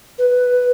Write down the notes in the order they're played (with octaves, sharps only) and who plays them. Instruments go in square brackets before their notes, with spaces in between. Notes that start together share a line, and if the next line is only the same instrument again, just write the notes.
[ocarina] B4